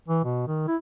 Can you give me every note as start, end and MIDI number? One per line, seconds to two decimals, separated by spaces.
0.08 0.21 52
0.24 0.46 47
0.47 0.63 51
0.68 0.76 64